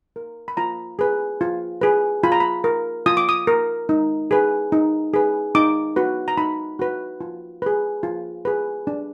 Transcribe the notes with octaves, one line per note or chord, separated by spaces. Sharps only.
A#4
B5
F4 A#5
G#4 B4
F4
G#4 B4
F4 B5
A#5
B5
A#4
F4 D#6
D6
D#6
A#4
D#4
G#4 B4
D#4
G#4 B4
D#4 D6
F#4 B4
A#5
D#4 B5
F#4 B4
F4
G#4 B4
F4
G#4 B4
D4